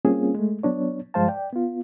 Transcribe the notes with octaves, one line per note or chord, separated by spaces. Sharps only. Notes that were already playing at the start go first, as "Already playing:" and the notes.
G3 A#3 C4 C#4 F4 G#4
G#3 A3
F#3 B3 D4 C#5
G2 F3 G#3 C5 F5 A5
D5 G5
B3 F4